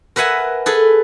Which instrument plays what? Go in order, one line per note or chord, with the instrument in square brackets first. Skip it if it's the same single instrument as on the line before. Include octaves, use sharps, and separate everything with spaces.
[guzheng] A#4 B4 E5 F#5 G#5
G#4 A4 B4